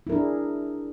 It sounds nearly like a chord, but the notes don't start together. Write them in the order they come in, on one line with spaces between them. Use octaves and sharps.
E4 A#4 D4 G#4